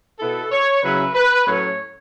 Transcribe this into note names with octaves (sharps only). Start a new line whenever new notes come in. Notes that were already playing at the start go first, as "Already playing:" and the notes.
B2 B3 E4 A4
C#5
C#3 F#3 C#4 E4 B4
B4
A2 F#3 A3 C#4 C#5